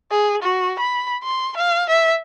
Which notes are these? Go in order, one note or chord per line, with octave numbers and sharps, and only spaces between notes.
G#4
F#4
B5
C6
F5
E5